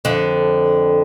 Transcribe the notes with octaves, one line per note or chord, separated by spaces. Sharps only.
F2 D3